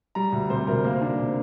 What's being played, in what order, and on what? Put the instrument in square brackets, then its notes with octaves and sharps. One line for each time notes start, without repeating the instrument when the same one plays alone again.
[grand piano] G3 A#5
D2
C3 C5
D2 A#4
A#3
D4
C3